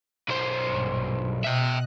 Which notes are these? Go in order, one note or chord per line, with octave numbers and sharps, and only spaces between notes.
B1 C5
A#1 G2
B2 D#5 E5 G5 F#6